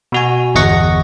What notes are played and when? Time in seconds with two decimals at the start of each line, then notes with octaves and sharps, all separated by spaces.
0.12 B2 F#4 G#5
0.55 G1 E2 D#5 F#5 C#6 A#6